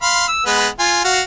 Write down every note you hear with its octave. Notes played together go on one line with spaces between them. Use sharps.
F5 B5 C6
E6
G#3 B3 B4
F4 G#5
F#4 F5